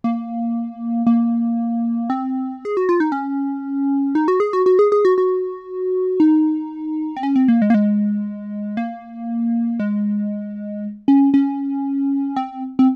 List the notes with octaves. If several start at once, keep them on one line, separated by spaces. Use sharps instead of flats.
A#3
A#3
C4
G#4
F#4
F4
D#4
C#4
D#4
F#4
G#4
F#4
F#4
G#4
G#4
F#4
F#4
D#4
C4
C#4
C4
A#3
G#3
A#3
G#3
A#3
G#3
C#4
C#4
C4
C4